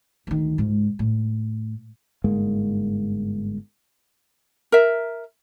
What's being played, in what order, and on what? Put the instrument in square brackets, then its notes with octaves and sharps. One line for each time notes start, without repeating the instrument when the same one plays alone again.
[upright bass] D2 D#3
C#2 G#2
A2
[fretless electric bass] G1 G#2 G#3 A#3
[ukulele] A#4 E5